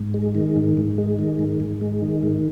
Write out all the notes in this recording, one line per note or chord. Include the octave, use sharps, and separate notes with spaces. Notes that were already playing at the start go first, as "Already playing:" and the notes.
Already playing: G#2
G#3
D#3
G#2
G#2
G#3
D#3
G#2
G#2
G#3
D#3
G#2